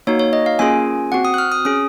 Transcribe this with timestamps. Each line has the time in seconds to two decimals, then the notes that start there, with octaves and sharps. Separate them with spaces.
0.07 A#3 D#4 F#4 C#5
0.19 C#5
0.33 D#5
0.46 F5
0.59 A#3 C#4 F4 G#4 G#5
1.12 C4 F#4 F#5
1.25 D#6
1.34 F#6
1.38 F6
1.52 D#6
1.65 C#4 G#4 D#6